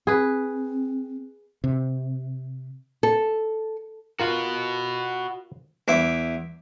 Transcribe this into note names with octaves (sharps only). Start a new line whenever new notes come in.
C4 G#4 B4
C3
A4
F4 F#4 A#4 B4
E2 E4 D6